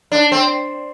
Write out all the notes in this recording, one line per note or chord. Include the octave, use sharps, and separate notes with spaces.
D4
C4